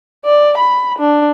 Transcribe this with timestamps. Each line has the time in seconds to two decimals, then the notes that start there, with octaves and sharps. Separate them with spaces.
0.25 D5
0.57 B5
0.99 D4